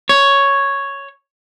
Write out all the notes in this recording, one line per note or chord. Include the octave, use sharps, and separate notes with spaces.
C#5